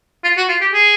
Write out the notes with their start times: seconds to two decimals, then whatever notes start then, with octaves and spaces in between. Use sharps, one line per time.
0.24 F4
0.37 F#4
0.49 F4
0.61 G4
0.73 G#4